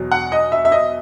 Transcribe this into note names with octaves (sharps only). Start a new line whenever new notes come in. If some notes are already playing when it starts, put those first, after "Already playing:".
Already playing: E2 B2 F#3
F#5
D#5
E5
E5
D#5